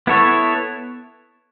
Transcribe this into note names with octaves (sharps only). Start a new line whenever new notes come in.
B3 E4 A4 C#5